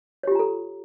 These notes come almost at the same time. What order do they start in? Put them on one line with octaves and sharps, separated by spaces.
C#5 G4 F4 A#5 A4